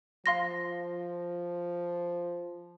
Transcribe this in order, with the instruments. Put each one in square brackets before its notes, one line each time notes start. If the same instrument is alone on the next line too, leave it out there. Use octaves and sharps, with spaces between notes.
[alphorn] F3 [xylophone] F5 C6 A#6